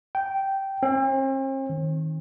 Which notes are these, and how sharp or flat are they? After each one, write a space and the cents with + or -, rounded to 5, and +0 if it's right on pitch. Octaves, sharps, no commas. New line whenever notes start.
G5 -10
C4 +45
D#3 +20